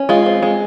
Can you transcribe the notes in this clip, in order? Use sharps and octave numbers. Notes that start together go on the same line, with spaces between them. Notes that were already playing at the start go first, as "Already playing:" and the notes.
Already playing: C#4
G#3 F4
C4
G#3